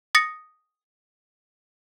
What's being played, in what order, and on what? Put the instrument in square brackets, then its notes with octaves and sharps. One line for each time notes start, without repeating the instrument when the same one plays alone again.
[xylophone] D#6 A6 A#6 C#7